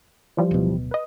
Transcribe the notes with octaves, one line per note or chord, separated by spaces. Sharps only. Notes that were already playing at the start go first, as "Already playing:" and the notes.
E3 F3 G3
D1 B2
B4 D#5